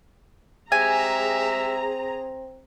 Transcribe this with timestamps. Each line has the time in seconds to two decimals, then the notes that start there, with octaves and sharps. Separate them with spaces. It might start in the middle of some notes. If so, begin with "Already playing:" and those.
0.72 G#3 C4 G4 G#4 E5 G#5 A#5